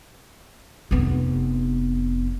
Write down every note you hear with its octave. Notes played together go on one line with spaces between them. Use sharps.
F1 B3